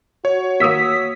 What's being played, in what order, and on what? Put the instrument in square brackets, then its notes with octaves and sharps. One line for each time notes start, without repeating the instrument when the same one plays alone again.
[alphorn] F#4 [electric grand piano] C#5
[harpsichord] D#2 A#3 [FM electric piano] D#6 E6 B6